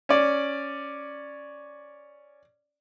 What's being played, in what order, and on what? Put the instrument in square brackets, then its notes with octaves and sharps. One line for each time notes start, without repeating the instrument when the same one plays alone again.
[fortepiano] C#4 D5